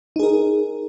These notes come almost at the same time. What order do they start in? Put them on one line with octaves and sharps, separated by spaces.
D#4 G#4 A#4